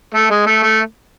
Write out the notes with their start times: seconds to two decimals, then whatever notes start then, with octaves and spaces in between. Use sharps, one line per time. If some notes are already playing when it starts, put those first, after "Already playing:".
0.14 A3
0.31 G#3
0.46 A3
0.63 A3